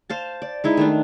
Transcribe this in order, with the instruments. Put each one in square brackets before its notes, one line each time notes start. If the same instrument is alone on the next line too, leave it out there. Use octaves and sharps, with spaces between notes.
[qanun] C5 F5 A5
D5
G#3 D#4 E4
D#3 A3 D4